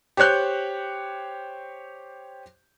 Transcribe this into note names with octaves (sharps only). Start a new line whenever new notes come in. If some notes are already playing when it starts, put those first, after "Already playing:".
G4 C5 C#5 F#6 G6